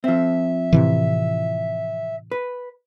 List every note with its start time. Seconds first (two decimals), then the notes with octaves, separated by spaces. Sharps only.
0.04 F3 C4 E5
0.73 A2 C3 E3
2.32 B4